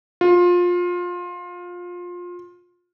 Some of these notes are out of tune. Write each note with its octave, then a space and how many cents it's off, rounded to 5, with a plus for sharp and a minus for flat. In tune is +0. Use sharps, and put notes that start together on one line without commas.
F4 +20